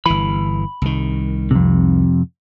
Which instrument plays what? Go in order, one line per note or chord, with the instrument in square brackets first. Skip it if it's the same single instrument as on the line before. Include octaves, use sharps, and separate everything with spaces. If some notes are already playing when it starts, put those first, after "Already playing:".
[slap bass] G1 E3 [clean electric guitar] B5
[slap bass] C2 D#3
[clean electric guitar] F2 C3